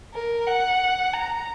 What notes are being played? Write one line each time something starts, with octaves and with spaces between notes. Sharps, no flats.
A#4
F#5
A#5